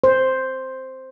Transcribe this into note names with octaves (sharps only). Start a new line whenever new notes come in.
C5